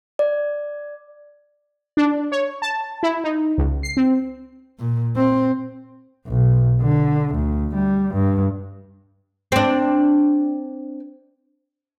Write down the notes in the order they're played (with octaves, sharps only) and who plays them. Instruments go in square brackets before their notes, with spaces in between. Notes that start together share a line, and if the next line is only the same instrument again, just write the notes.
[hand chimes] D5
[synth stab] D4
C#5
A5
E4
D#4
C#2
C7
C4
[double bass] A#2
C4
B1
D3
D2
G3
G2
[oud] C4 D4